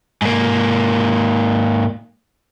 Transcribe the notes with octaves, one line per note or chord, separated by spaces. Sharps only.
G#2 A#3